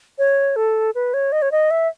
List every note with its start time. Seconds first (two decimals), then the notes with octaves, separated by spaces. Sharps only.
0.18 C#5
0.56 A4
0.95 B4
1.14 C#5
1.32 D#5
1.42 C#5
1.52 D#5
1.71 E5